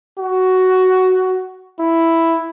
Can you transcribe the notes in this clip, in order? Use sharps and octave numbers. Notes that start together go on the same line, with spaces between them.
F#4
E4